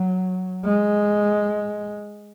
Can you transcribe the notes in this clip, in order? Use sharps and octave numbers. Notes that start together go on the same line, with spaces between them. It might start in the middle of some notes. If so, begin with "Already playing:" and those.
Already playing: F#3
G#3